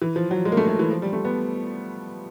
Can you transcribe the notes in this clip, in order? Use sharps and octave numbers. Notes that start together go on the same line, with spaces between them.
E3
F3
F#3
G#3
A#3
A3
A3
E3
F3
G3
A3
B3